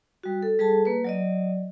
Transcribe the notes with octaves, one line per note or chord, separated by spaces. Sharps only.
G3 F#4
A4
G3 G#4 A4 A5
A#3 B4
F#3 D5 D#5